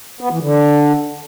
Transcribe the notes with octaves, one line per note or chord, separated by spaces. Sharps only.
B3
E3
D3